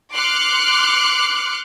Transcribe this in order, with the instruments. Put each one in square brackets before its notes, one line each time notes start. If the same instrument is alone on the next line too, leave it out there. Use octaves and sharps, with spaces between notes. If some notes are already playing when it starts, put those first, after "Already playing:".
[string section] C6 D6 F6 F#6 C#7